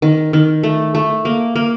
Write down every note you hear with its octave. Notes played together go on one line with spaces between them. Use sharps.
D#3
D#3
A3
A3
A#3
A#3